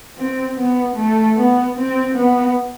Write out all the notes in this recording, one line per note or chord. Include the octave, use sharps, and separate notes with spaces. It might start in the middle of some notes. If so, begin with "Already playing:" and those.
C4
B3
A3
B3
C4
B3